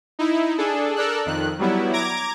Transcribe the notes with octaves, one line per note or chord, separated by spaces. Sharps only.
D#4 E4
D4 G#4 A4
A4 A#4 D5 E6 F#6
F2 D#3 F#6
F#3 G3 B3 E4
A#5 D6 G#6 A#6 D7